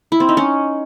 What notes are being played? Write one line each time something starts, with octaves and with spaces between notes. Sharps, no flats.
E4
C4
D#4
C#4